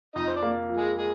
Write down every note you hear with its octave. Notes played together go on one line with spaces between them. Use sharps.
F2 D#4 D#5
C5
D4 D5
A#3
F3
G#3 G#4
G#3 G#4